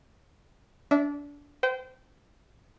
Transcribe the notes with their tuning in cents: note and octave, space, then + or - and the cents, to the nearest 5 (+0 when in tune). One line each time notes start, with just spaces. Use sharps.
D4 -25 E5 -20
C5 -30 G5 -20